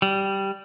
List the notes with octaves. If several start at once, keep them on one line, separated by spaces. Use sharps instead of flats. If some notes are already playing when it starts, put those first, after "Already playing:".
G3